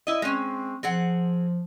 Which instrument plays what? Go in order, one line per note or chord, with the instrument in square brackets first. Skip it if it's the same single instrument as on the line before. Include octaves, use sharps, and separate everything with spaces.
[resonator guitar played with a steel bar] E4 D#5
[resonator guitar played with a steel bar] G#3 C#4 [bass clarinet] C4
[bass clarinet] F3 [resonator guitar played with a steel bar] C4 G#4 F#5